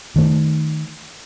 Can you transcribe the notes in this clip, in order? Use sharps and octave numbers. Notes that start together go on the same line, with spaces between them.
D#3 A3